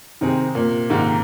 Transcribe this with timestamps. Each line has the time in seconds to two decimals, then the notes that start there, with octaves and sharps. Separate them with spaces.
0.21 C3 D#3 C4 G#4
0.55 A#2
0.90 G#2 C3 D#3 A#3